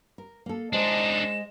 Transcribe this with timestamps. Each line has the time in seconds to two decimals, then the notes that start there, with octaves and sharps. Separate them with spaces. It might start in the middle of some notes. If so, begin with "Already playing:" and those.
0.18 A#4
0.46 A#3 A4
0.73 G#3 D4 D#4 C5 D#5 E7